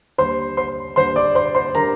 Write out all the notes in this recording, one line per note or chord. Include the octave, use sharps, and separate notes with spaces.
D#2 D3 G3 C5 C6
C5 C6
D#2 D3 G3 C5 C6
D5 D6
C5 C6
C5 C6
D3 G3 A#4 A#5